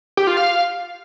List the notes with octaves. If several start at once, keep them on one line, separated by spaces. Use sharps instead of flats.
G4
F4
F5